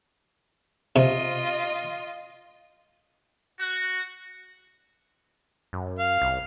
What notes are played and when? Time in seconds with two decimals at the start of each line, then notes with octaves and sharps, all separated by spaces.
0.96 C3 F4 D#5
3.60 F#4
5.73 F#2
5.99 F5
6.22 C2